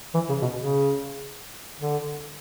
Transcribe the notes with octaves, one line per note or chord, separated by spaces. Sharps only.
E3
C#3
B2
C#3
D3